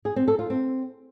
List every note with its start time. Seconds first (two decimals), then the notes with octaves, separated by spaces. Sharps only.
0.05 G#4
0.16 C4
0.28 A4
0.39 F4
0.50 C4